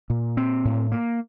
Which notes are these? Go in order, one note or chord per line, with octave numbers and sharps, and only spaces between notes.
A#2
C4
A2
A#3